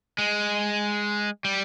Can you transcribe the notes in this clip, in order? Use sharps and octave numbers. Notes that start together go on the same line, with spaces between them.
G#3
G3